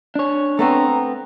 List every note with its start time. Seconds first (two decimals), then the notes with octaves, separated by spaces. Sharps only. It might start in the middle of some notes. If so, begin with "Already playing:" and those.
0.15 D4 C#5
0.59 A3 B3 C4 A#5